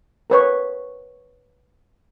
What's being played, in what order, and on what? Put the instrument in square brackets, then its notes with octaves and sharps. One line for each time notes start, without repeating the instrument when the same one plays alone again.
[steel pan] A#4 B4 C#5